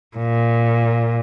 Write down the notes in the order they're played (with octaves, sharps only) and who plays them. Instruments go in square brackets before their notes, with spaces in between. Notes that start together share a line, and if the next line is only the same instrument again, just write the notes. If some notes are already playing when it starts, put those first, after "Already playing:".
[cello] A#2